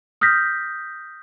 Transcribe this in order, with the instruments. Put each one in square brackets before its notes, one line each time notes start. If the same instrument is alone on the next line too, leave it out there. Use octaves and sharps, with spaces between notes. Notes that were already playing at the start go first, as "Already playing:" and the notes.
[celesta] D#6 F6 G6 A#6 B6